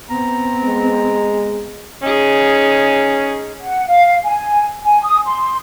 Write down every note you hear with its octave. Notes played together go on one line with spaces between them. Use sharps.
B3 C4 A#5
G#3
C#4 D#4 G#4
F#5
F5
G#5
G#5
D#6
C6